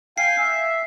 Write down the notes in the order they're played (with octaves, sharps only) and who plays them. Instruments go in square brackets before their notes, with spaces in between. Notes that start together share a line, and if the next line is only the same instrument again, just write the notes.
[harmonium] F5 G5 G#5 [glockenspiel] C7
[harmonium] E5